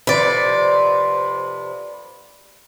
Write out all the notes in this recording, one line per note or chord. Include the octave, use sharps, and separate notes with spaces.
F2 C3 D#3 B4 D5